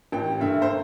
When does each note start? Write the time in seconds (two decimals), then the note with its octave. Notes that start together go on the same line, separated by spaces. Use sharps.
0.12 A1 G5
0.40 G2 D3 E5
0.62 C5